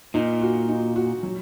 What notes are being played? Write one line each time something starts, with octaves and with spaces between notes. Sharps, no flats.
A#2 D#4
F#4
D#4
F#4
F#3